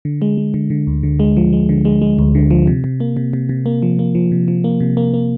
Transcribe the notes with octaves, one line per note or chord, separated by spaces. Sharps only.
D3
G#3
G#3
D3
D3
D2
D3
G#3
F3
G#3
D3
G#3
G#3
D2
D3
F3
C3
C3
A#3
C3
C3
C3
A#3
F3
A#3
F3
C3
F3
A#3
C3
A#3
A#3